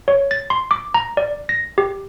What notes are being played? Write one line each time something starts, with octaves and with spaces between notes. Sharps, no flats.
C#5
A6
C6
D6
A#5
D5
A#6
G4